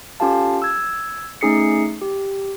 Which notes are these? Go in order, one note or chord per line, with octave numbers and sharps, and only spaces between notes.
C#4 F4 G4 A4 F5 A5
E6 G#6
A3 C#4 D#4 G#4 C7 C#7
G4